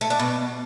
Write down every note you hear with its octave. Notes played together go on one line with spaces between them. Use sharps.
A3
D4
B2